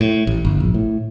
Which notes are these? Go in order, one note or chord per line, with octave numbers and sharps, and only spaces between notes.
A2
A1
G1
A#1
A2